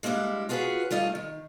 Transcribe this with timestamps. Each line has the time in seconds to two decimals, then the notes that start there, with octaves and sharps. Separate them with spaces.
0.03 G3 G#3 A#3 D4 E4
0.49 F4 F#4 G#4 A4 B4 C#5
0.91 G3 A3 F4 D#5
1.15 D#3